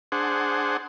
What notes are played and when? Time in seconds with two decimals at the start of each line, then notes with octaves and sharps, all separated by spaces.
0.12 D4 G#4 C5 F#5